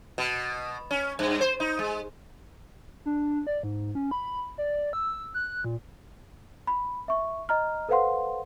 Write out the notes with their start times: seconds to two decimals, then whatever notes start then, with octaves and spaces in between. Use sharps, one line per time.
0.18 B2
0.91 C#4
1.19 G2
1.41 C5
1.60 D#4
1.79 G#3
3.06 D4
3.47 D5
3.63 G#2
3.95 C#4
4.11 B5
4.58 D5
4.93 E6
5.34 F#6
5.64 A#2
6.67 B5
7.08 E5 C#6
7.49 D#5 A#5 F6
7.89 A4 B4 C5 F5 F#5 C6